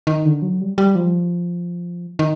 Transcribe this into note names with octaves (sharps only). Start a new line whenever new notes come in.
D#3
D3
F#3
G3
G3
F3
D#3